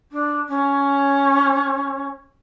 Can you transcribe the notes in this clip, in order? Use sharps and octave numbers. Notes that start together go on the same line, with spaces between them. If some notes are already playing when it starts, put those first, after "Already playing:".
D4
C#4